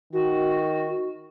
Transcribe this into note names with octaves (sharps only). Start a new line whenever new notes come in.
D#3 F#4